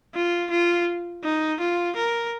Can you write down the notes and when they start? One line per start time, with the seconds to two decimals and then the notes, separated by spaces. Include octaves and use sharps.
0.15 F4
0.51 F4
1.23 D#4
1.60 F4
1.96 A#4